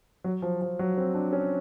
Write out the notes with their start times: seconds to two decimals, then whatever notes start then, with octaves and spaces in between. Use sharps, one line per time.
0.24 F#3
0.42 F3
0.62 F3
0.79 F#3
0.97 C4
1.15 D4
1.33 C#4